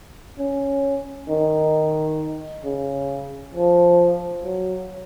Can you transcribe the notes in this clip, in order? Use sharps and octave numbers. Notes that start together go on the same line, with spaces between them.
C#4
D#3
C#3
F3
F#3